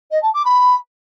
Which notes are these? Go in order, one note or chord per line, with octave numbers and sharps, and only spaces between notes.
D#5
A5
D6
B5